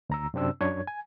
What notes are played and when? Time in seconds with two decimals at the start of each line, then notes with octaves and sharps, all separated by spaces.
0.10 D2 A#5 E6
0.34 F#2 C3 C4 D4 E6
0.61 F#2 D4 C#5 G#6
0.87 G#5